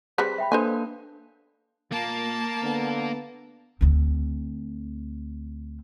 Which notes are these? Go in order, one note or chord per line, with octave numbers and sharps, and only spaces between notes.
G3 C4 G#4 B4 B6
E5 G5 B5
A#3 D4 A4 B4 C5 D#5 G#5 C6
A#2 A#3 A5
D3 B3
D2 C4